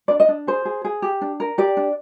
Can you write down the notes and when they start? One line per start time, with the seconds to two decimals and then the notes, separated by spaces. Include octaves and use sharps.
0.08 D4 D5
0.20 D#5
0.29 D4
0.47 G#4 C5
0.65 G#4
0.85 G#4
1.02 G4
1.21 D4
1.40 A#4
1.58 G4 D5
1.77 D4